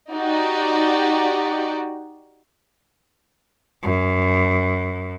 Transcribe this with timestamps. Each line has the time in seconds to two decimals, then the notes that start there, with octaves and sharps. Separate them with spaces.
0.12 D#4 F#4 G4 D5
3.83 F#2